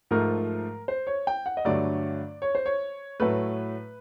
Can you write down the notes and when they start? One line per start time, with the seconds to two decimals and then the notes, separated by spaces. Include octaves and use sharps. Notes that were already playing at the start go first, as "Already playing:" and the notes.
0.11 G#2 F3 A3 A#4
0.88 C5
1.07 C#5
1.27 G5
1.46 F#5
1.57 D#5
1.65 G2 D3 F#3 A3 D5
2.42 C#5
2.55 C5
2.66 C#5
3.20 A2 F#3 A3 B4